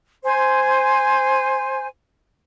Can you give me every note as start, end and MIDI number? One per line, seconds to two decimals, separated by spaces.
0.24 1.88 72
0.24 1.88 80